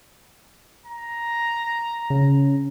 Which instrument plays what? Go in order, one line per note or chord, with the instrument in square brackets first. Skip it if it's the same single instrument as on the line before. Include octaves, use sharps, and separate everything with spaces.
[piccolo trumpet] A#5
[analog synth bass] C#3